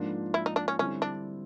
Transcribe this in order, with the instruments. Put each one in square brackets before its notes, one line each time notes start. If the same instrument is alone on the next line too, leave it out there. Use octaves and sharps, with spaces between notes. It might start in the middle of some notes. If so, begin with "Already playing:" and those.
Already playing: [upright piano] G#2 F3 A#3 D4
[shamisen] E4
D#4
D4
C#4
[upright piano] D3 G3 C4 E4 [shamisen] C#4
[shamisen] D4